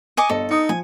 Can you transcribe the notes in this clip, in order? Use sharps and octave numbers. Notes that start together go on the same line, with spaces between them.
D#5 G#5 D6 C#7
G1 A4 D#5
D#4 D#6 C#7
F3 G#5